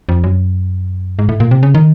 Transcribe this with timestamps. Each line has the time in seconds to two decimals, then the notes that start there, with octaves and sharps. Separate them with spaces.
0.09 F2
0.24 F#2
1.19 G#2
1.29 A2
1.40 A#2
1.51 C3
1.63 C#3
1.75 D#3